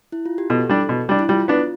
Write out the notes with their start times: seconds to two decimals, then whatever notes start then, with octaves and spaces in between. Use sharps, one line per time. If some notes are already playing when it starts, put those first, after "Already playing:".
0.12 E4
0.26 F4
0.38 G4
0.50 B2 A4
0.69 G3 D4
0.89 B2
1.09 G3 D4
1.19 E4
1.29 G3 F4
1.48 B3 D4